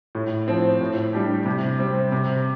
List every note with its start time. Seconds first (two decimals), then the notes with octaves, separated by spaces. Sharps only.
0.15 A2
0.48 F3 C4
0.81 A2
1.13 G3 D4 G4
1.46 C3
1.79 G3 C4
2.12 C3